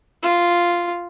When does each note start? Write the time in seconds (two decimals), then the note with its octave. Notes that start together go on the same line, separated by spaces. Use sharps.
0.23 F4